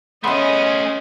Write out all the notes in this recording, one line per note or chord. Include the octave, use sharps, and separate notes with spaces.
A3 B3 C#4 G#4 D#5 E5 C6